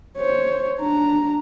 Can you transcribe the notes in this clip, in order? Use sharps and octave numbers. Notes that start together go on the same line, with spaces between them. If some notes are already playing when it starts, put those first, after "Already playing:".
C5 C#5
D4 A#5